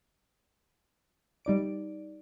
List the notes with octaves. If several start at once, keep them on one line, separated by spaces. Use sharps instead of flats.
G3 D#4 D5 D7